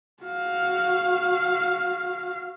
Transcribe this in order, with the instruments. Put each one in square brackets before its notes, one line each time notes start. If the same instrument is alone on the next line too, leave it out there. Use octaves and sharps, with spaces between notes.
[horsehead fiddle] F#4 F5